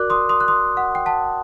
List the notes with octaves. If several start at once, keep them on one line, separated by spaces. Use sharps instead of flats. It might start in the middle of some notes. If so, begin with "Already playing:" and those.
Already playing: F#4 A#4 D5 D6 F#6
C6 D#6
C6 D#6
F#6
C6 D#6
F#5
G5
F#5 A5